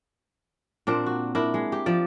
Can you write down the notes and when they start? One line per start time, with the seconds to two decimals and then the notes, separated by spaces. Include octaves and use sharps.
0.87 A#2 C4 D4 A#4
1.06 F#4
1.35 D4 E4 A#4
1.54 G#3
1.72 G4
1.86 F3 D5